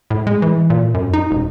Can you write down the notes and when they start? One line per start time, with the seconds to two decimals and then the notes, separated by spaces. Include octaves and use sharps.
0.10 A2
0.27 G#3
0.42 E3
0.70 A#2
0.94 F#2
1.13 D#4
1.31 E1